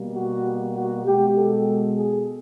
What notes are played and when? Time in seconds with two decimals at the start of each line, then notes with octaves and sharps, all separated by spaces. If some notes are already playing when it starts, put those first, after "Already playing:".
Already playing: B2 G3 A#3
0.14 F#4
0.75 F#4
1.05 B2 G#3 G4
1.37 A4
1.98 G#4